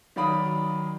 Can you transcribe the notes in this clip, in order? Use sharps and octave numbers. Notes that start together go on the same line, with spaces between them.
D#3 F#3 D5 F5 B5 D#6